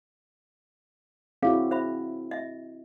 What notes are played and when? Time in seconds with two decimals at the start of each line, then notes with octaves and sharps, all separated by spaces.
1.43 C4 E4 F#4 G#4 C#5 F5
1.71 C5 E5 B5
2.31 D#5 E5